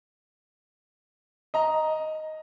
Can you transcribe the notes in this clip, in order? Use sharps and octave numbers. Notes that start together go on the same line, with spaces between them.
D#5 A#5